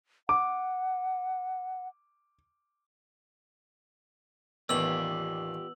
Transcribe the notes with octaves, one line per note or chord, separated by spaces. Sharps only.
F#5 D6
A1 D#2 B3 F4 G4 D5 E6 F#7